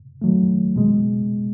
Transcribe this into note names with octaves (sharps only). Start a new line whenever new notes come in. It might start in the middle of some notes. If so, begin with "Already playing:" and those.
D#3 F#3 A3
B2 G#3